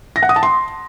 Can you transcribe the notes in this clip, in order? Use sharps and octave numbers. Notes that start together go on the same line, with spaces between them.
A#6
F#5
D#6
A5
C6